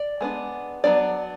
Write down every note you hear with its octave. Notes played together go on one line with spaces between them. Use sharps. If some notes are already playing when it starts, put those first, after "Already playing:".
Already playing: D5
G#3 B3 D4
F#3 B3 D4 D5